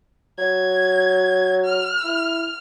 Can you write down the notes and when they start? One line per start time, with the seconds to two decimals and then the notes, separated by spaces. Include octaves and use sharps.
0.38 F#3 G#6
1.65 F6
2.04 E4